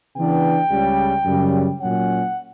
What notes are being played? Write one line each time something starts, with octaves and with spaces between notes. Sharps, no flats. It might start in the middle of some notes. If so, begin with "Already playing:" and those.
C#3 E3 B3 D4 G5
C#2 C#3 G3
F#2 C#3 G3
A#2 F#3 C#4 F#5